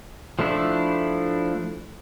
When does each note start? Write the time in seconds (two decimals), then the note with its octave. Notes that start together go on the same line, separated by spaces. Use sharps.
0.39 F3 A3 D4 E4